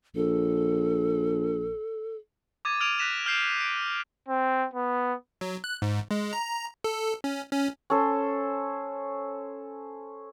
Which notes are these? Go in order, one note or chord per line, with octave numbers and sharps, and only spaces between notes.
A#1 A4
D6 D#6 G#6 A6 D#7
D#6 F6 G#6 D7 D#7 F7
F#6 A#6 B6 E7 F7
F6 G6 C7 D7 E7
D7
C4
B3
F#3
F#6
G#2
G#3
A#5
A4
C#4
C#4
C#4 A4 C5